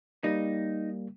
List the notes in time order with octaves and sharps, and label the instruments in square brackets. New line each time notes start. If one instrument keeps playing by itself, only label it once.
[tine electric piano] G3 A#3 [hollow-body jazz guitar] D#4